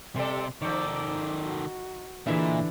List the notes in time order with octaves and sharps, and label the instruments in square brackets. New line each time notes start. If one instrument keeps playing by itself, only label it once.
[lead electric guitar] C3 [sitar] G3 A4 D5
[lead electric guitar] D#3 A4 [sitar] F3 D#4 [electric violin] D5 D6
[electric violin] F#4
[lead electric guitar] A#2 [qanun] D3 E3 [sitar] G#3 E5 [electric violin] D4